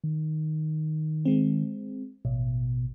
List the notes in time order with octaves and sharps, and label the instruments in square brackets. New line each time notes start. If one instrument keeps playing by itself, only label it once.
[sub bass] D#3
[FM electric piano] G#3 C4
[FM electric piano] A1 [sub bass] B2